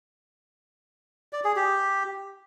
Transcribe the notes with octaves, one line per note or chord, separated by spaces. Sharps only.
D5
G#4
G4